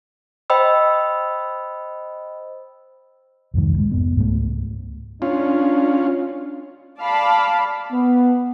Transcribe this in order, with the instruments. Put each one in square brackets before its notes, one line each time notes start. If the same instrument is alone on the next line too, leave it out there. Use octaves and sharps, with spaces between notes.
[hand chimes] C5 D#5 G5 B5 E6
[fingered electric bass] C2 F2 G#2 D#3
G#3
F1 G#2 B3
C#2 G#2 F#3 A3
[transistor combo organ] C#4 F4 [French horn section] D4
[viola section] D5 F5 A5 B5
[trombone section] B3